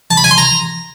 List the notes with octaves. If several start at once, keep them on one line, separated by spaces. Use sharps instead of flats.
A5
B5
G#5
C6
A#5